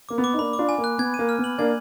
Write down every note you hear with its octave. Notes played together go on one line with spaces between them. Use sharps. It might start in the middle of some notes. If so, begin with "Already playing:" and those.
A#3 D6
B3
D6
D#4
A#3 D4 B5
D6
D4 F4
G#5
A#3
F#6
B3 G#6
D#7
A#3
F6
B3
F#7
A#3 D4 G#6